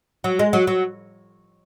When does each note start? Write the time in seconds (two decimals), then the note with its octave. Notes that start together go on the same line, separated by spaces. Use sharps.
0.24 F#3
0.39 G#3
0.53 F#3
0.67 F#3